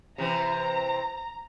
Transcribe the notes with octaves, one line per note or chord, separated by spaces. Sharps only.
C3 E3 C4 A#5